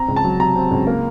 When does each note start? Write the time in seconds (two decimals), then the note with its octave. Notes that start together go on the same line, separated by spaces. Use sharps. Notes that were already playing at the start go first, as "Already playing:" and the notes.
Already playing: C4 A#5
0.08 C#2
0.16 A5
0.24 F#3
0.40 C3 A#5
0.56 C4
0.71 C#2
0.87 A#3